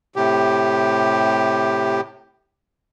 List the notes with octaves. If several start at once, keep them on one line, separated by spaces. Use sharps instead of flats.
A2 C3 G4